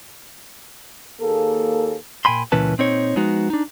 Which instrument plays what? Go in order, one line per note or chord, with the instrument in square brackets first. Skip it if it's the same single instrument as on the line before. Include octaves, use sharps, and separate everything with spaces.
[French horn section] D#2 A#3 G#4 A4
[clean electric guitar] A#2 G5 G#5 B5 C6
C#2 A#2 E3 C#4 B4 A5
A#2 C4 D#4 C#5
F3 G#3 B3 D#4 F#4
D4 D#4